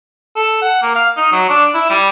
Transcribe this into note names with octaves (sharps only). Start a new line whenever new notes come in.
A4
F#5
A#3
F5
D#4
F#3
D4
E4
G3